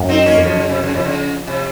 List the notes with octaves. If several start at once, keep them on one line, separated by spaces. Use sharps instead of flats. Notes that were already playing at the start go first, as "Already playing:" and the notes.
Already playing: F#2
C4 D#4
A#3 C#4
F2
F#2 C#3 F3
C#3
C3
C#3
C3 F3
C#3
C3